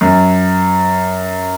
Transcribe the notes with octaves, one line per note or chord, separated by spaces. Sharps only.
F#2